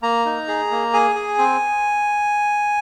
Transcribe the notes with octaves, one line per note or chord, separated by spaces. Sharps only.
A#3 A#5
D#4
G#4
A#3
G#4 G#5
G#4
C4